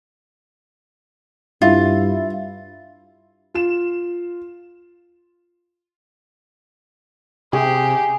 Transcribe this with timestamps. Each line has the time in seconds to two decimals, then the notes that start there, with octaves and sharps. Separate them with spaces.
1.62 G2 E4 F4
3.54 F4 E7
7.53 C3 G4 G#4